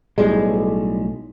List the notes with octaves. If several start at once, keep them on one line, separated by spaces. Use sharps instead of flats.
B1 A2 G3 G#3